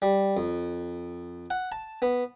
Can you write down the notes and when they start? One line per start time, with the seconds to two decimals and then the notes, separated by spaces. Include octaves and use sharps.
0.02 G3
0.37 F2
1.50 F#5
1.72 A5
2.02 B3